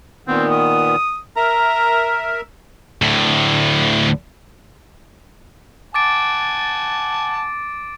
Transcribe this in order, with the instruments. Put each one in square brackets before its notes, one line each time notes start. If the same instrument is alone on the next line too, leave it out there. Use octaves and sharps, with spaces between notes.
[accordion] A#2 D#3 B3 [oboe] C4
[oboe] D#6
[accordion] A#4 E5 [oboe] A#5
[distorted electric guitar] D2 A2
[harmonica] F#5 G#5 A5 [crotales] D6 A6 D7